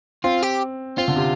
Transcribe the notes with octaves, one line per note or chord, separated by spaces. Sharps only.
C4 F4
G4
C4 F4
D3
C3